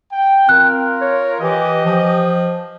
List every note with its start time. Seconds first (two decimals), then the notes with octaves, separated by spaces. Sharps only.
0.12 G5
0.49 C4 F4 A#4 F#6
1.01 C#5
1.41 E3 G4 D#5
1.86 F3